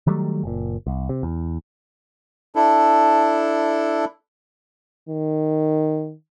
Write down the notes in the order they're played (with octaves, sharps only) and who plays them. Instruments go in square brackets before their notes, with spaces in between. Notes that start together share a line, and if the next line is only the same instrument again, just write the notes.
[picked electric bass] D#3 F#3 G3 A3
F#1 A#2
C2
C3
E2
[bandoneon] D4 E4 A4
[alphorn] D#3